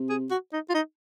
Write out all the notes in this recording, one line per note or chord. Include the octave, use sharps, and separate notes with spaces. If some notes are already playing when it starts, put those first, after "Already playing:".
Already playing: C3
G#4
F#4
D#4
F4
D#4